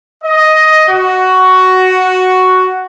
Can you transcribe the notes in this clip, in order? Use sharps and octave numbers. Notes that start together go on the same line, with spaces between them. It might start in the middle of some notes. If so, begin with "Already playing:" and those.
D#5
F#4